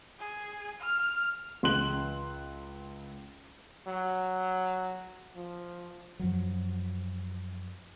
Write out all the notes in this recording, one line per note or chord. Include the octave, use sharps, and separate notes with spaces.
G#4
F6
C#2 C6 F#6 F#7
F#3
F3
F#2 F3 F#3